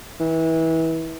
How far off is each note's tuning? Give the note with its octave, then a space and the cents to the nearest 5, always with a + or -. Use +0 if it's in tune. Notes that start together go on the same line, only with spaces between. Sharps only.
E3 -25